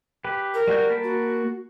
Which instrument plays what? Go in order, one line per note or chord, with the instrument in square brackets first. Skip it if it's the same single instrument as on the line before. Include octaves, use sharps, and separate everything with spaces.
[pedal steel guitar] G4 B4
[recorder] A#4
[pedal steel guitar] G3 F#4 G6
A#3 A5 B5
[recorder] F#4